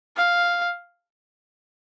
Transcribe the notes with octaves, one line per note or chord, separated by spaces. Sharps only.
F5